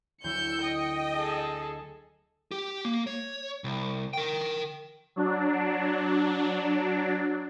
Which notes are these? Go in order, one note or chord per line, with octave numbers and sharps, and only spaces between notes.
D2 F#3 E4 E6 G6 C#7
D#5 G5
G#4 A4
G4
A#3
C#5
C2
A#4 G5
F#3 D4